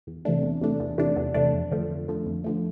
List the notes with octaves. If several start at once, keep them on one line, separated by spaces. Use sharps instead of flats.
E2
C3 E3 A3 D4
E2
C3 E3 A3 D4
E2
C3 E3 A3 D4
E2
C3 E3 A3 D4
F2
D3 F3 A3
F2
D3 F3 A3
F2
D3 F3 A3